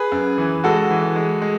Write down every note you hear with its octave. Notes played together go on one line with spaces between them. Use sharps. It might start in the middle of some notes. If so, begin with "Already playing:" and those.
Already playing: G#4 B4
F#2
E3
G#3 F#4 A4
E3
G#3
G#3